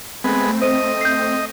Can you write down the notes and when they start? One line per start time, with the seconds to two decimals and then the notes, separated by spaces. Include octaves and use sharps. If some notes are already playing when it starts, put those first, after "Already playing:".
0.24 G#3 A3 B3 C4
0.62 C5 D#5 D#7
1.01 G6 C7